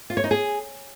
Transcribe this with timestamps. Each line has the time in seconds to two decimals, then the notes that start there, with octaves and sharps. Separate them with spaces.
0.10 F4
0.17 C#5
0.24 D#4
0.31 G#4